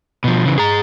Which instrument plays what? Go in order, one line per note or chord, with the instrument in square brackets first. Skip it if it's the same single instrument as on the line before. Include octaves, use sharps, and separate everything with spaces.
[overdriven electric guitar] B2 F3
C#3 E3
G#4 A#5